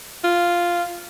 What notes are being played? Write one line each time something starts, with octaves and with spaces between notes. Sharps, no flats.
F4